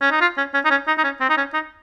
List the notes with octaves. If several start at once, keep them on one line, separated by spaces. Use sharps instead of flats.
C#4
D#4
F4
C#4
C#4
D#4
C#4
D#4
D#4
C#4
C4
D#4
C#4
D#4